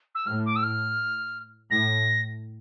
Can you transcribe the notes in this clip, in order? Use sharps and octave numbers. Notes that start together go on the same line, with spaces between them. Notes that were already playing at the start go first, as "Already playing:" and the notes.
E6
A2 F6
D6
E6
F6
A2 A#6